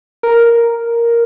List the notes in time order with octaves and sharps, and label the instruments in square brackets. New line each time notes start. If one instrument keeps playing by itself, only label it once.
[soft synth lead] A#4